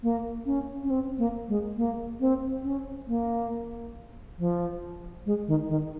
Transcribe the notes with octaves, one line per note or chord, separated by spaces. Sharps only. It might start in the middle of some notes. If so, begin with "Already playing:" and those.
A#3
C#4
C#4
C4
A#3
G#3
A#3
C4
C#4
A#3
F3
G#3
D#3
D#3